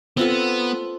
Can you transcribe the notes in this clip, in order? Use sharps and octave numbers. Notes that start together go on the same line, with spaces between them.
B3 C4 F4 A4